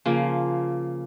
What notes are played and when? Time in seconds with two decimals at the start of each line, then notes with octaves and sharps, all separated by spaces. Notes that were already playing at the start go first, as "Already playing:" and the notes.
0.06 C#3 F3 A#3